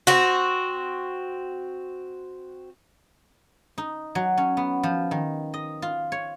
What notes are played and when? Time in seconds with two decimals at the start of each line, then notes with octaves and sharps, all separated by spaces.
0.07 C4 F#4
3.78 D#4
4.15 F#3
4.37 C#4
4.57 B3
4.83 F3
5.11 D#3
5.54 D#5
5.82 F4
6.12 C#5